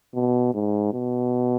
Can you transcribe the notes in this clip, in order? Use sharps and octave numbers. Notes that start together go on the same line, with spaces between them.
B2
G#2
B2